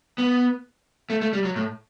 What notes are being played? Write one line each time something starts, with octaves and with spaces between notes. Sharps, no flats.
B3
A3
A3
G3
F#3
A2